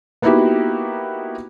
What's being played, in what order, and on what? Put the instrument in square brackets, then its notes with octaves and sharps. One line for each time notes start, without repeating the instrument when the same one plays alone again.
[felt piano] A#3 B3 D#4 E4 F#4 G4